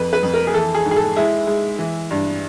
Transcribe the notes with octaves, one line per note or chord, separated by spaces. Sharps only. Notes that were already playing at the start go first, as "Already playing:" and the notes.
Already playing: F2 B4
B4
F2
A#4
G#4
E3 A4
G#4
G#2
G#4
A4
G#3 E4
G#3
E3
G2